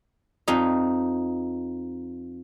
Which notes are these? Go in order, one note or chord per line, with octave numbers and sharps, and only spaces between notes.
F2 D#4